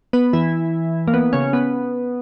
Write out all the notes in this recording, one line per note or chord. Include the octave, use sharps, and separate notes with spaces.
B3 B4
E3 E4
A#3
B3
C#3 C#4
B3